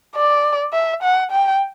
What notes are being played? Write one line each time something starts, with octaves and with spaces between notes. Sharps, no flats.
D5
E5
F#5
G5